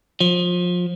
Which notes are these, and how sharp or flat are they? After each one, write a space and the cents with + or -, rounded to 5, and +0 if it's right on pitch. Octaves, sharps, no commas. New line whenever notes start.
F3 +25